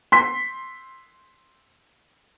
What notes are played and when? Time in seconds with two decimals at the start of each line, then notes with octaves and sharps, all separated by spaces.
0.12 C6 B6